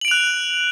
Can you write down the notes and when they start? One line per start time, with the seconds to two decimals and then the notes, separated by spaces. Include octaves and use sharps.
0.01 F#7
0.05 D7
0.08 F7
0.11 F#6